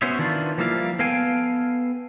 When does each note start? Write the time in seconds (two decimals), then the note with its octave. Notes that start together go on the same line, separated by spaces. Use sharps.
0.02 B3 C#4 F#4 C5 C#5 E5
0.19 D#3 E3 D4 F4
0.58 F3 G3 A#3 E4 F5
0.99 B3 A4 F5 G5 G#5